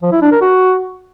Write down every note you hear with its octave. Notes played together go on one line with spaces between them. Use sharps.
F3
E4
D4
A#4
F#4